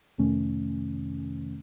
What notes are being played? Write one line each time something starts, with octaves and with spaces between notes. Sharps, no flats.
F2 C3 D#3 A3 C#4